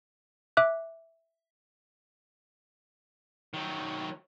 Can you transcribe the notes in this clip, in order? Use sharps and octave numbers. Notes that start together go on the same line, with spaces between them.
E5 D6 F#6
D#3 F#3